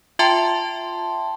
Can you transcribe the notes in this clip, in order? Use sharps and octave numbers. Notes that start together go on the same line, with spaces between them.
F4 E5 G5 A5 C6